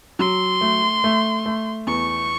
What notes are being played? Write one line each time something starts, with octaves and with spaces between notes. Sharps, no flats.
F#3 C6
A3
A3
A3
E2 C#6